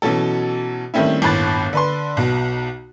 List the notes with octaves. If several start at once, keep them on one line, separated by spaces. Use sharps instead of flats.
B2 E3 F#3 C#4 A4
D#3 G3 A3 C4 C#4 E4
G1 D#2 A2 B5 F#6 A6
D3 B4 C6
B1 B2